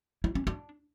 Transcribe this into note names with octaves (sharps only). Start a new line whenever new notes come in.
E4
C#4
D4